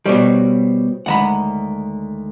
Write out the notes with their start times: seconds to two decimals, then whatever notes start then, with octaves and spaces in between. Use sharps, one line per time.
0.06 B2 G3 C5 C#5 C#6
1.06 D2 D#3 G#3 F#5 A#5 B5